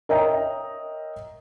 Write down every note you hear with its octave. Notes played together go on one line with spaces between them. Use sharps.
A#4 C#5 D#5 E5 G5 A#5